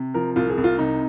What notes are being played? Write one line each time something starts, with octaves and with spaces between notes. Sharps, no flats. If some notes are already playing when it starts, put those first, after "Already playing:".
Already playing: C3
F3 A#4
C2 F4
G#4
C2
F4
C3 D#4